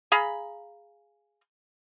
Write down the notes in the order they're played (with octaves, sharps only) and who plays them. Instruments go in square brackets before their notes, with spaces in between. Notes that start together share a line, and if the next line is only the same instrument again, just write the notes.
[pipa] G#4 F5 A#5 B5